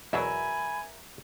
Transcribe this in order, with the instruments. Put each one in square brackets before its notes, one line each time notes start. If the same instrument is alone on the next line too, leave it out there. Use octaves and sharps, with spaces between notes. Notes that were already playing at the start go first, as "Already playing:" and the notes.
[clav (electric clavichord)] E2 B2 F#3 [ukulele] A#4 E5 [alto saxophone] G#5 [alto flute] B5